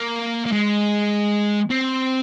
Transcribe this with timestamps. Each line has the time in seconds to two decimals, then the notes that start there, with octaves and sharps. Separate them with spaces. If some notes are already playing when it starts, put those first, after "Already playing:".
Already playing: A#3
0.46 A#3
0.52 G#3
1.71 C4